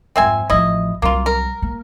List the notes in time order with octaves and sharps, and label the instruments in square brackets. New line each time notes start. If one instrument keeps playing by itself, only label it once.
[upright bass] F2 G#2 [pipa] C4 E5 G#5
[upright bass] A1 F3 [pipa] E4 D#5
[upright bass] C2 F#3 [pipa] A#3 F4
[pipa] A#4
[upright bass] A#3